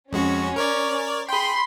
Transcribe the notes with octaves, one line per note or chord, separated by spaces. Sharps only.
F2 G#3 C#4 F#4
A#4 C#5 D5
G#4 G5 B5 C6